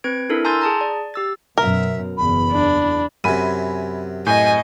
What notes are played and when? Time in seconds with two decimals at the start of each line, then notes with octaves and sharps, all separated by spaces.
0.04 C4 B4 G#6 D7
0.30 D4 E4 A4 A#4
0.45 G#5 A#5 C6 E6 G6 A6
0.61 G#4 A5 A#5
0.81 D5
1.14 G4 E6 A6
1.58 F#2 B2 A#4 E5
2.17 F#1 E2 B5
2.52 D4
3.24 F#2 C3 G#5 B5 D#7
4.27 A2 D#5 G#5 G6